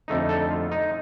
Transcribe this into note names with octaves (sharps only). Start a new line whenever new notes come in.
F2 D3 A3 D#4
A4
F4
D#4